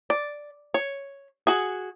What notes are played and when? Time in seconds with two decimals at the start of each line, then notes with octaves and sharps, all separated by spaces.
0.10 D5
0.74 C#5
1.47 F#4 G#4